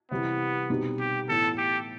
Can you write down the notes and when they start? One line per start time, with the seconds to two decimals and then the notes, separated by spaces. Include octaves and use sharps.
0.11 C3 E3 G3 B3
0.70 B2 G3 C4 D#4
1.00 G4
1.28 A2 E3 B3 A4
1.58 G4